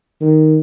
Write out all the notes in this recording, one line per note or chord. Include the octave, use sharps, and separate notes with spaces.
D#3